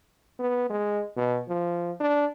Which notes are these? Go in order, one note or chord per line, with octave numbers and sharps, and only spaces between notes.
B3
G#3
B2
F3
D4